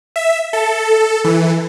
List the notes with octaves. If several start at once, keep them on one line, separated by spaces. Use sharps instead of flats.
E5
A4
E3